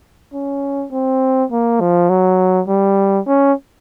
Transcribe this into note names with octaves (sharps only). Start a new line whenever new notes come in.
C#4
C4
A#3
F3
F#3
G3
C#4